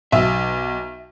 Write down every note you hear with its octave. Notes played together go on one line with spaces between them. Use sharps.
B1 E5